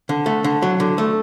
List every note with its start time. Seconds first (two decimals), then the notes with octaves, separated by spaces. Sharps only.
0.09 D3
0.26 A3
0.44 D3
0.62 F#3
0.80 D3
0.98 A3